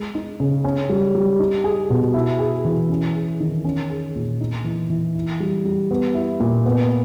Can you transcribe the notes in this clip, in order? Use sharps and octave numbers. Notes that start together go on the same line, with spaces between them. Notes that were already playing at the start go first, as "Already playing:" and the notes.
Already playing: G#3
D#4
C#3
C#4
G3
G3
D#4
G#4
B2
E4
G#4
E3
C#4
G#4
D#3
C#4
G#4
A#2
D#4
E3
E3
E4
G3
G3
B3
E4
A#2
B3